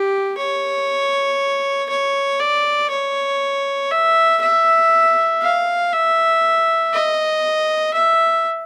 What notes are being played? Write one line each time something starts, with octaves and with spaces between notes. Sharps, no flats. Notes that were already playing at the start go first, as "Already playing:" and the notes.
Already playing: G4
C#5
C#5
D5
C#5
E5
E5
F5
E5
D#5
E5